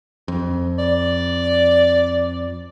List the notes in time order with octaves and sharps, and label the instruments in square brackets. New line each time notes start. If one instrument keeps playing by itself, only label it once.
[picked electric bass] F2
[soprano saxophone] D5